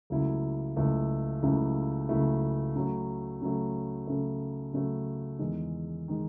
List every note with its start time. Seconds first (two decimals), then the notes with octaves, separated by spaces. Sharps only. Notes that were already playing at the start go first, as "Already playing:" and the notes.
0.10 C#2 C#3 F#3 A3 E4
0.76 C#2 C#3 F#3 A3 E4
1.42 C#2 C#3 F#3 A3 E4
2.09 C#2 C#3 F#3 A3 E4
2.75 C#3 F#3 A3
3.41 C#3 F#3 A3
4.07 C#3 F#3 A3
4.73 C#3 F#3 A3
5.39 E2 D#3 G#3
6.08 D#3 G#3